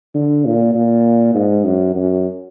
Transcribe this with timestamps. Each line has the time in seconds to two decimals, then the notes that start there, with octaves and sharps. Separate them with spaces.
0.14 D3
0.45 A#2
0.75 A#2
1.34 G#2
1.64 F#2
1.95 F#2